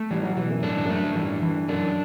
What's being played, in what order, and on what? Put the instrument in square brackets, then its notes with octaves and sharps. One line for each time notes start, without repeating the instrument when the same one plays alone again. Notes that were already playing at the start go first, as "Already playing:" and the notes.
Already playing: [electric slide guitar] A3
[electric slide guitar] E3 [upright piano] G3
[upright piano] F#3
[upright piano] B2 [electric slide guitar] E3
[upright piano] F#2
[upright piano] A2 [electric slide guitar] D4
[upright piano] G2
[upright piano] F#2 [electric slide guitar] A3
[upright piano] G2
[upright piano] G2 [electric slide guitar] E3
[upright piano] G2 [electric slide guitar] E3
[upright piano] F#2 [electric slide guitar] D4